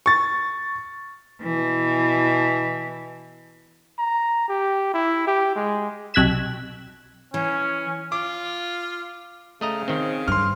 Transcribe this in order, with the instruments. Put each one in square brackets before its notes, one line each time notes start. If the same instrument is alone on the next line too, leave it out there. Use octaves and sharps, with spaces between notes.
[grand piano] C#6 A6
[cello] B2 E3
[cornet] A#5
G4
E4
G4
G#3
[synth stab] B1 C3 F#6 G#6 B6 E7
[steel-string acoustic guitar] E3 [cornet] C#4
[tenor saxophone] F4 [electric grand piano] D6
[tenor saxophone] C#3 [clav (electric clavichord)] A3 D#5 A#5
[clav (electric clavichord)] D#3 C4
[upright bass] G2 [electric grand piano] C6 F6